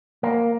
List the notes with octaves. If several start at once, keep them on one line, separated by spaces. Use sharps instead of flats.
A#3